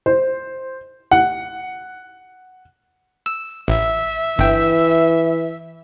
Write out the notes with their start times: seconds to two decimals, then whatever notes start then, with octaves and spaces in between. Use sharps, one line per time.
0.06 C5
1.11 F#5
3.26 E6
3.68 A1 E5
4.39 G1 E3 G5